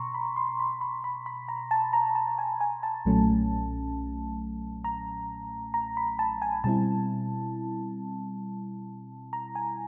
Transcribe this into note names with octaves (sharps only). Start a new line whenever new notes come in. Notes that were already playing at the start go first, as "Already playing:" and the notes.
Already playing: B2 A#5 C6 C#6
B5
C6
B5
B5
B5
B5
A#5
A5
A#5
A5
G#5
G#5
A5
B1 A#2 F#3 A3 C#4
A#5
A#5
B5
A5
G#5
B2 G3 C4 E4 A5
A#5
G#5